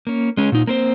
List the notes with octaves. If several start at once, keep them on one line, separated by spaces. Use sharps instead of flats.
A#3 C#4
G#3 C#4
A#2 D#4
A#3 C4 C5